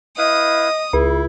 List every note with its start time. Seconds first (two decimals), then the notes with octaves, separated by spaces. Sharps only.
0.18 E4 B4 D#5 F5 D#6
0.93 C#2 E4